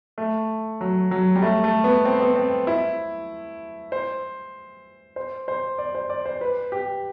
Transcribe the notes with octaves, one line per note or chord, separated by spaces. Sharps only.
A3
F#3
F#3
G3
A3
A3
B3
C4
B3
C4
E4
C5
C5
C5
D5
C5
D5
C5
B4
G4